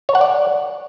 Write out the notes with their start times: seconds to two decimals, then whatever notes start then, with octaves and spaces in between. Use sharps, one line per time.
0.09 C#5
0.15 F#5
0.21 D5